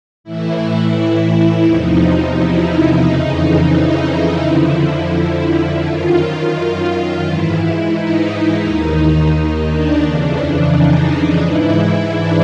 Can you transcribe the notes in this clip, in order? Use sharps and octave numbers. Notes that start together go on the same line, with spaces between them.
A2 E3 E4
E2 C3 F3 D#4
E4
F2 C#3 E3 D#4
E4
E4
F2 D3 F3 E4
F#2 D#3 F4
G#2 E3 E4
D#4
D#2 D#3
D#4
D4
F2 C#3 E3 D4
D#4
G#2 E3 E4
D4